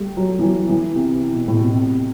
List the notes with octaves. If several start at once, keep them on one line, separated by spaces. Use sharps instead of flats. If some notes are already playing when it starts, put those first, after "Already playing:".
Already playing: G3 A3
F#3
E3
F#3
E3
C3
B2
A2
B2
C3